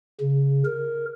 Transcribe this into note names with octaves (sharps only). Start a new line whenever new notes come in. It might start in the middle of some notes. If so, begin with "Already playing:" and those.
C#3
A#4